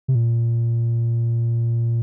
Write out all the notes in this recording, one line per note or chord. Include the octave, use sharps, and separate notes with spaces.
C3
A#2